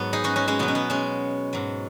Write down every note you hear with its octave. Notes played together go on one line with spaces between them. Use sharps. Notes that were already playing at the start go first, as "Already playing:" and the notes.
Already playing: G#2 F#3 B3
D#4 G#4
C#4 F#4
C#4 F#4
G#3 C#4
B2 F#3 B3
C#4
B3
G#3 C#4
G#2 F#3